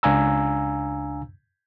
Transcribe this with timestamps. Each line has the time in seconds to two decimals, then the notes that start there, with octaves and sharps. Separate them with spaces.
0.03 C#2 D4 F5 G#5 A#5 E6